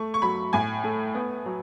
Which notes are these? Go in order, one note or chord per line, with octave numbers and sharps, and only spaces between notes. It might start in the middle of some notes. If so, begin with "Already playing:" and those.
Already playing: A3 C#6
C#6
F#3 B5
A2 G#5
A3
B3
F#3